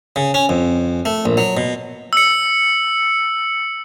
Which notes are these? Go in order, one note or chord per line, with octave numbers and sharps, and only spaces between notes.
C#3
C#4
F2
A3
A#1
F#3
B2
E6 C#7